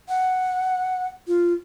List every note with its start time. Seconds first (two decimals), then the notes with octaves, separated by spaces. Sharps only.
0.09 F#5
1.27 F4